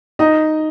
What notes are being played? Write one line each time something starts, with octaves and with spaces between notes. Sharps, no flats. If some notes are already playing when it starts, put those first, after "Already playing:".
D#4 D#5